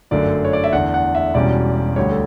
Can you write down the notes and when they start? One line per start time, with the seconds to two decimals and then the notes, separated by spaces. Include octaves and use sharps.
0.11 G1 F#2 D3 A3 D4 D5
0.45 C#5
0.53 D5
0.64 E5
0.73 E2 D3 A3 D4 F#5
0.94 F#5
1.15 E5
1.34 E1 E2 B2 G3 C#4 D5
1.96 D2 D3 G3 C#5
2.11 A4